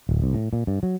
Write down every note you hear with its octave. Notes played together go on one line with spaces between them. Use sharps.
D1
C2
A2
A#2
G2
F#3